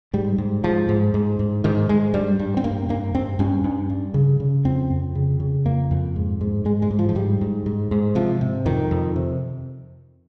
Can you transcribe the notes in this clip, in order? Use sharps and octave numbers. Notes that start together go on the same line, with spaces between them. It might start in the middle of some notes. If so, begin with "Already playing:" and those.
G#2 G3
G#2
G#2 F3
G#2
G#2
G#2
G#2 D#3
G#2 G#3
G2 G3
G2
C4
G2 A#3
G2 A#3
G2 C4
G2 C#4
G2
G2
C#3
C#3
F2 C4
F2
C#3
C#3
F2 A#3
F2
G#2
G#2
G#2 G#3
G#3
G#2
F3
F3
G#2 G3
G#2
G#2
G#2
C3 F3
C3
F2 D#3
F2
C3